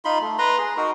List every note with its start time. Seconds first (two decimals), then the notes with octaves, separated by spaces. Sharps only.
0.05 D#4 F4 B5 C6
0.21 A3
0.38 B4 A#5 C6
0.58 G#4
0.77 D#4 F#4 A#4